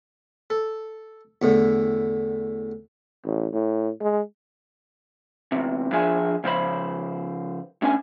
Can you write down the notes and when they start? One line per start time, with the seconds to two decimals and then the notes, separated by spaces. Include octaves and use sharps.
0.50 A4
1.42 E2 A2 D3
3.24 A1
3.53 A2
4.01 G#3
5.52 E2 C3
5.92 F3 D4 G#4 E5 G#5
6.44 C#3 F3 C5 B5
7.82 A2 C#4 D4 G#5